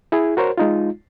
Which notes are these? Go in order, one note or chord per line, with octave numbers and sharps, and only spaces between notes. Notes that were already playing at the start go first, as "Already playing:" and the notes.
E4 G#4
F#4 A#4 C5 C#5
G#3 D#4 F4